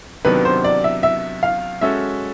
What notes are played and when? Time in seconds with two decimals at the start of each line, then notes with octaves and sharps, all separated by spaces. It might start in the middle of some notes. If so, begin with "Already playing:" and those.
0.25 C3 D#3 F#3 B3 D4 B4
0.45 C5
0.64 D5
0.84 E5
1.03 E5
1.43 F5
1.81 G#3 C#4 F#4 A4 E5